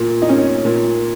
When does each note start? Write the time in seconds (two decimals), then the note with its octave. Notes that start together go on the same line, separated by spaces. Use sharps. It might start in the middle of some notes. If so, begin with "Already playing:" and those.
Already playing: A#2
0.22 D#4
0.29 C#4
0.65 A#2